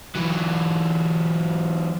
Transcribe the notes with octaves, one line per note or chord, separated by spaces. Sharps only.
E3 F#3